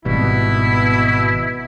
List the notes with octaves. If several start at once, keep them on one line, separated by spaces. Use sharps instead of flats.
G#1 B2 G3 E4